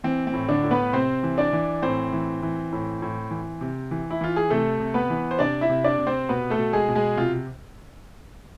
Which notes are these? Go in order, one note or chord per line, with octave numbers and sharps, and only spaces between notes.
E3 C4
C4
A2
D3 D4
A2
B3 B4
C3 C4 C5
E3
D4 D5
E3
A2 C4 C5
E3
E3
A2
A2
E3
C3
E3
E4
E3 F4
G#4
C3 A3 A4
C3
B3 B4
E3
C5
C3 D4 D5
E4 E5
C3
D4 D5
C3
C4 C5
B2 B3 B4
A3 A4
B2
G#3 G#4
B2
G#3 G#4
C3 F4